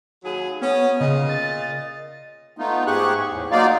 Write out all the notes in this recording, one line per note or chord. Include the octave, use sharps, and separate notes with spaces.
D#2 F#3 G#4
B3 C#4
A#2 C#3 D#5
A6
A3 B3 D#4 F4
G#2 G4 G#4 C#6 F#6
E2 A2
F#3 A#3 D#4 F4 D5 F5